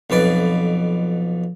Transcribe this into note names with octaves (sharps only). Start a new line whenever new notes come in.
B1 F2 B4 D5